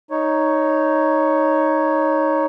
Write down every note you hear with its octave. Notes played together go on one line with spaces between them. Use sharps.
D#4 C#5